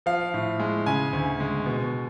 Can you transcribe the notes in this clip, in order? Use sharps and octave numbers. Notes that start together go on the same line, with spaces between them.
F3 F5
A2
G#3
C#3 G#5
D2
G#3
B2